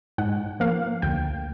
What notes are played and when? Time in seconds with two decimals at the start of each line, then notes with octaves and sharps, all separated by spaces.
0.18 G#2 F#5
0.60 F3 A#3 F5
1.02 D2 G5